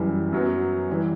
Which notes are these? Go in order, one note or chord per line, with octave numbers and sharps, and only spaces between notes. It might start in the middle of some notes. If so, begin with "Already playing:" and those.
Already playing: F#2 E3 G3
F#2 F#3 B3
E3 G3